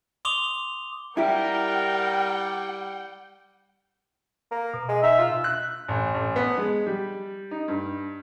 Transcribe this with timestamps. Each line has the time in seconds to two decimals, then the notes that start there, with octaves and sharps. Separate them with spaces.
0.25 C6 D6 D#6 F7 G7
1.17 G3 E4 G4 A#4 F#5 G5
4.51 A#3
4.74 B2
4.89 G#3
5.03 D#4 E5
5.18 F4
5.44 F#6
5.88 A1
6.14 A1
6.36 B3
6.57 G#3
6.86 G3
7.51 D#4
7.68 G2